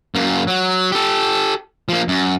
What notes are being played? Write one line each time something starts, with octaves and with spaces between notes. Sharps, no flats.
F#2 A#3
F#3
G4 A4
F3 A#3
F#2